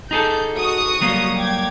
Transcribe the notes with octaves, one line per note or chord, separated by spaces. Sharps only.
D#4 G#4 A4 G6
F#4 C#6 D#6
F#3 G3 A#3
G5 D6 G#6